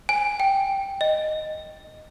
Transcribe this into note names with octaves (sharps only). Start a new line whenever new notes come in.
G#5
G5
D#5